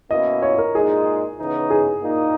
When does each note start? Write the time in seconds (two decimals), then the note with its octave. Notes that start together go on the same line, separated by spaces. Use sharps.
0.10 B2 A#3 C#4 E4 D#5
0.42 C#5
0.58 A#4
0.74 A#2 G#3 D#4 G#4
1.38 C#3 E3 B3 D#4
1.70 G#4
2.03 A#2 A#3 D#4